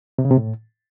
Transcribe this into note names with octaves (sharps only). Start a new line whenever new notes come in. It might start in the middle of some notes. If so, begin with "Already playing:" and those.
C3
C#3
C3
A2